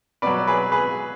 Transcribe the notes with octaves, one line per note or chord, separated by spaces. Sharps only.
B2 F#3 B4 D5
G#4 B4
G#4 B4